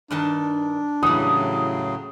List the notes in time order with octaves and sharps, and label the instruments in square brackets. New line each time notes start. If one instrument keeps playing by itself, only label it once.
[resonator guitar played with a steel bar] G2 D#3 A5 [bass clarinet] D4
[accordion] A2 C#3 F#3 [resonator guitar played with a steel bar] E3 G3 [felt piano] D#6